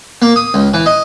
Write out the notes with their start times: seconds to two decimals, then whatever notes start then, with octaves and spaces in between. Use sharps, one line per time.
0.22 A#3
0.36 D#6
0.54 C#2
0.74 E3
0.86 D#5